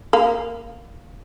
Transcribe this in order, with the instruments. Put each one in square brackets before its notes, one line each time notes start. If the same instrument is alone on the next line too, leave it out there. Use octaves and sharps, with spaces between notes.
[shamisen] A#3 F5